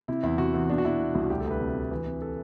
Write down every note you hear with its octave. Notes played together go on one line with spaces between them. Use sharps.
C3 E4
E2 E4
C3 F#4
E2
B2 D4
F#4
B2 E4
B2
C2
F#4
D2 G4
A4
D2
B4
C3
D2
E3
C3
A4